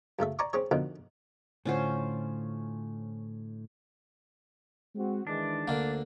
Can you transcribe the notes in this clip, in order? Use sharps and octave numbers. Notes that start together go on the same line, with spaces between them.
F#2 C#3 A3 E5
D5 G#5 A#5 C#6 D6
C4 C#4 G#4 C#5
F2 B2 D3 D#3
A2 D3 C#4 F4 C5 F#5
G#3 C4 F#4
D#3 E3 G#3 D4
D2 D3 A#3